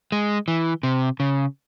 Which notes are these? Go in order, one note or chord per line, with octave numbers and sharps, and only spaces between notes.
G#3
E3
C3
C#3